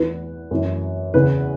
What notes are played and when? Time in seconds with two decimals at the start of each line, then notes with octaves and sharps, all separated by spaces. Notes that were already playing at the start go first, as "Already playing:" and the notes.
Already playing: E2 E3 B4
0.51 F#2 E3
1.14 E2 C#3 E3 B4